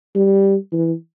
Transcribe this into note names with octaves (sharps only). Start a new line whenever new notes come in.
G3
E3